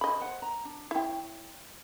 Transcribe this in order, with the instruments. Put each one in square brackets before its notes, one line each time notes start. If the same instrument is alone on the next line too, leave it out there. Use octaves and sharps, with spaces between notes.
[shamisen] D#5 B5
[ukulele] C5 F#5
A#5
D4
[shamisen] E4 [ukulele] C#5 G5